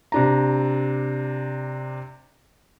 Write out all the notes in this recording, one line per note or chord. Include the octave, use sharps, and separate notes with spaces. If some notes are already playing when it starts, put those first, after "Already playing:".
C3 D4 A#5